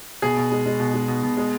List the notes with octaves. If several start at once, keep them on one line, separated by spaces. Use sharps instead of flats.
B2 G#4
B2
G#3
G#3
B2
G#3
B2
B2
G#3